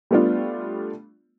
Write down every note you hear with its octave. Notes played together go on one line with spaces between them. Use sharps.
G3 A3 B3 D4 F4